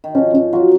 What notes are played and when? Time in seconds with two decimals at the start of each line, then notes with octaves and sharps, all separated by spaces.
0.04 D#3
0.15 F3 C#4
0.34 C#4
0.53 F#3 F4